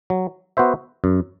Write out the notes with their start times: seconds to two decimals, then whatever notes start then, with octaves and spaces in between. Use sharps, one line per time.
0.10 F#3
0.57 B3 F#4 C5 E5
1.04 F#2